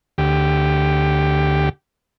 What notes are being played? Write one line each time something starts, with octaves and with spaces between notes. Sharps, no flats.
D2 G4